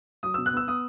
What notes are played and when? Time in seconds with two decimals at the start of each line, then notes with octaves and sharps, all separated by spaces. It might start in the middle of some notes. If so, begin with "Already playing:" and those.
0.23 F#3 D#6
0.34 B2 E6
0.46 F#6
0.53 B3 E6
0.68 B3 D#6